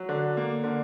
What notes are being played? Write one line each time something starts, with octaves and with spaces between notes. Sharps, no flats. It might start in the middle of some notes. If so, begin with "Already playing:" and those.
Already playing: F#3
D3
A#3
D3